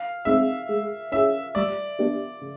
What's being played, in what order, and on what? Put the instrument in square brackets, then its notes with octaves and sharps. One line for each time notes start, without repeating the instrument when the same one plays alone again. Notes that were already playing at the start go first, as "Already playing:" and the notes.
Already playing: [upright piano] F5
[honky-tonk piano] G#3 C4 D#4 [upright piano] E5
[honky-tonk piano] G#3
[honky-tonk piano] C#4 E4 G#4 [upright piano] E5
[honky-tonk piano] G3 [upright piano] D5
[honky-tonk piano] B3 D4 G4
C#3